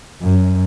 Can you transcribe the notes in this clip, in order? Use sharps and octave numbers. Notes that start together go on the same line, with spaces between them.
F#2